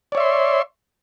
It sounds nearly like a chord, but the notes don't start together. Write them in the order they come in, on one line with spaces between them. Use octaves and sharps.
D5 C#5 E5 C6